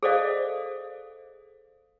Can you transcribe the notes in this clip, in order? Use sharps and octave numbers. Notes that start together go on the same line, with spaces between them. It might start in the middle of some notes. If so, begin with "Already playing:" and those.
G#4 A4 C5 D5 D#5 F5